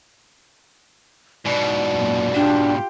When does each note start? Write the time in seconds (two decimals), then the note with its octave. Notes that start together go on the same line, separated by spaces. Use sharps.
1.46 G#2 B2 D5
1.92 F#2 A#2
2.35 D4 F4 G4 G5